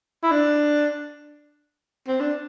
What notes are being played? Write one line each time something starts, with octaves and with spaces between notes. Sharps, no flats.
E4
D4
C4
D4